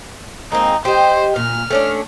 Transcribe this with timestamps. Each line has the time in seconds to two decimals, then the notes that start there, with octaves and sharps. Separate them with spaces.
0.52 G#3 A#3 C4 D#4
0.85 G4 C5 D#5
1.36 A#2 F6
1.70 A3 C#4 D4